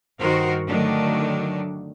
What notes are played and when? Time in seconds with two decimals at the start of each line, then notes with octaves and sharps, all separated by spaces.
0.20 G2 D#3 F#4 A#4 C5
0.68 D3 D#3 F#3 A3 D4